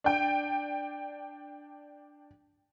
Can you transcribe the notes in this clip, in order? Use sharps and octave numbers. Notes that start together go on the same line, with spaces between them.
D4 G5